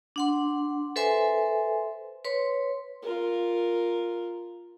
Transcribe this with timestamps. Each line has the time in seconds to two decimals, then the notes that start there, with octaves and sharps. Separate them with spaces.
0.16 D4 F#5 C6
0.96 A4 B4 C5 E5 G#5 C6
2.25 B4 C#5 C6
3.03 F4 A#4